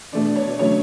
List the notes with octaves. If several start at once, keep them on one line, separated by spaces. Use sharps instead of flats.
B2 A3 D4 D5
C#5
C#3 F#3 A3 D4 C#5